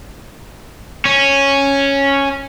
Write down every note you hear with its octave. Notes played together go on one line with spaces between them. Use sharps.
C#4